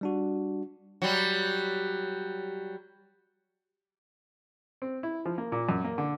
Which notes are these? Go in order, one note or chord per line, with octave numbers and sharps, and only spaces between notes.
G3 D4 F#4
F#3 G3
C4
E4
F3
A#3
A#2
F#2
A#3
D3